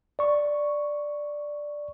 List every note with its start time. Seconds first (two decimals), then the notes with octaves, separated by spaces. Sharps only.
0.19 D5 C#6